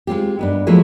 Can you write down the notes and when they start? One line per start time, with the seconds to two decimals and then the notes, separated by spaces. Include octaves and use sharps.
0.07 G#3 C4 F4 G4
0.39 G2 B3 D#4
0.67 F3 F#3 G#3 A3 E4